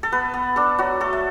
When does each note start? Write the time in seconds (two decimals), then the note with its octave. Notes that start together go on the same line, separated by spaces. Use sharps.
0.03 A4
0.12 B3 B4
0.34 B3
0.56 D4 A4
0.79 F#3 F#4
1.00 A3 A4
1.13 E5